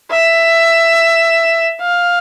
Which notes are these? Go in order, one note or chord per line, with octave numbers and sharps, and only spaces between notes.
E5
F5